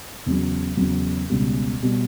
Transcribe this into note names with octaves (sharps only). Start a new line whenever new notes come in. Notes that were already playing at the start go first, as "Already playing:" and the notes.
E2 C#3 F#3
E2 C#3 F#3
C#2 B2 G3
B2 G3